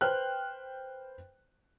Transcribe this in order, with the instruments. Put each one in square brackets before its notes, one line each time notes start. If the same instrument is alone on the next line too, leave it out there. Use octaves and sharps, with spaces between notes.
[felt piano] B4 C5 G5 F6 F#6